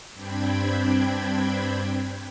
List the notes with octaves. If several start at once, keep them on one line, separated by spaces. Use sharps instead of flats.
G2 C4 D4 G5 B5 G#6